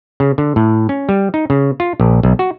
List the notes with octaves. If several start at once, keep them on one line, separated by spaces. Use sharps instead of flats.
C#3
D3
A2
C#4
G3
D#4
C#3
F4
A#1
B1
F#4